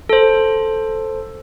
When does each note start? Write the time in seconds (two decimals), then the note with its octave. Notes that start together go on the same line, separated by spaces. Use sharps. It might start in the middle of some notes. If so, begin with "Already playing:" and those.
0.09 A4 C5